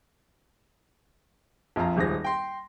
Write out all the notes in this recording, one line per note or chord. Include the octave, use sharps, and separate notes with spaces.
A#1 F2 F4 F5 A#5
D#1 G#1 G#4 A#6
G5 C6